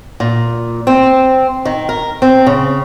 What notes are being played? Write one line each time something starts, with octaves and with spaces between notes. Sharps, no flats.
A#2
C4
D#3
A#4
C4
C#3